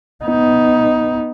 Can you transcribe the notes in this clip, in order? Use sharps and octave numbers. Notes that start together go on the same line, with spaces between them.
B3 D#4